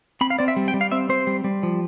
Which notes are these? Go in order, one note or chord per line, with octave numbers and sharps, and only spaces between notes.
C4 B5
F5
C4 D5
E5
G3
G5
G3
F5
C4 E5
C4 C5
G3
G3
F3